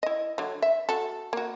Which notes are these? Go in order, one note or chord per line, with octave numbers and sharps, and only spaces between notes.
E4 D#5
D3 F#3
E5
F#4 A4
A#3 F#4